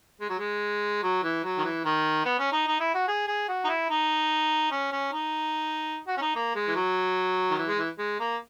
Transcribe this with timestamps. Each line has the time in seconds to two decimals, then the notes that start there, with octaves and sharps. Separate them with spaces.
0.21 G#3
0.30 F#3
0.39 G#3
1.03 F#3
1.23 E3
1.44 F#3
1.58 D#3
1.65 E3
1.85 D#3
2.25 B3
2.39 C#4
2.52 D#4
2.67 D#4
2.80 E4
2.94 F#4
3.08 G#4
3.27 G#4
3.48 F#4
3.65 D#4
3.68 E4
3.90 D#4
4.71 C#4
4.92 C#4
5.12 D#4
6.08 F#4
6.17 C#4
6.22 D#4
6.35 A#3
6.55 G#3
6.68 E3
6.75 F#3
7.51 D#3
7.58 E3
7.68 G#3
7.78 E3
7.99 G#3
8.20 A#3